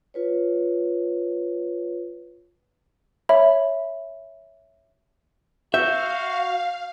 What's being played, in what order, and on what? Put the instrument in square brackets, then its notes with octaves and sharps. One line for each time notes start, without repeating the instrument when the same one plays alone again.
[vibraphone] F4 B4 C#5
[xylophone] C#5 E5 B5
[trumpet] F#4 [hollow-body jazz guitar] E5 [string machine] F5 [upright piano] G6